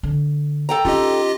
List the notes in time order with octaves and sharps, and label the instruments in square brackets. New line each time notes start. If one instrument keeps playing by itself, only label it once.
[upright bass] D3
[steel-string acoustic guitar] A4 G5 A#5
[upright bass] C#4 D#4 [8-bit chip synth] F4 G4 D#5